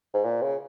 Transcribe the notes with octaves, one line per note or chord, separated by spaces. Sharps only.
G#2
A#2
C#3